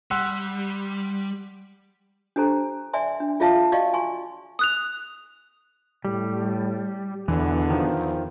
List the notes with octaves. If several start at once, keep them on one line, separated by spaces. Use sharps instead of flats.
G3 F#5 C6 E6
D4 G4 A4 C5 A#5
D5 E5 G#5 C6
D4
F4 G#4 C#5 E5 F5 A5
F#4 D5 D#5 F5 C#6
G#5 C6 C#6
D#6 F#6 F7
A2 G3
E2 B2 D3 E3 B3
D#3 F3